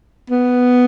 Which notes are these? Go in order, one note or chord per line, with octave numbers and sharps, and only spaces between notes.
B3